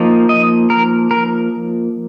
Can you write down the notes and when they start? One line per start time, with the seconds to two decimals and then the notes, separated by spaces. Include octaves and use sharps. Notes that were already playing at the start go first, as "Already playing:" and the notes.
Already playing: F3 A#3 D#4
0.29 D#5
0.70 A#4
1.11 A#4